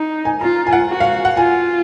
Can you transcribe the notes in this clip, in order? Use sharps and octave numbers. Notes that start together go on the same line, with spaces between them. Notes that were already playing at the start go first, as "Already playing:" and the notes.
Already playing: D#4
G#5
F4 A#5
G#5
F#5
F#4
F5
F#5
F4 G#5